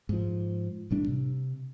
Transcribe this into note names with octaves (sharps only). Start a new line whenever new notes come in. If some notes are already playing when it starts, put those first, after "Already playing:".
G#2 F3
A1 A2 G3 D4
C3